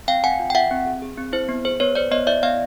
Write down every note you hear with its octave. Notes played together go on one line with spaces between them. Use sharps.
C4 F5 G5
C4 F#5 G#5
F4
G5
F4 E5 F#5
C4
G#4
G#4
C4
E4 C5
B3
G#4 C5
B3 B4 C#5
B3 C5 D5
B3 C#5 D#5
E4 D5 E5
B3 D#5 F5